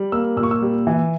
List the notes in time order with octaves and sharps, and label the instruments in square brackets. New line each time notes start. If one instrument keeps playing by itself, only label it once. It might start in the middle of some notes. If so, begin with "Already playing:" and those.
Already playing: [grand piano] G3
A#3 E6
A#2 E6
C#6
E6
G3
E3